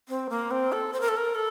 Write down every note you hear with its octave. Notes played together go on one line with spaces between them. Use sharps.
C4
A#3
C4
A4
C5
A#4
A4
A#4
A4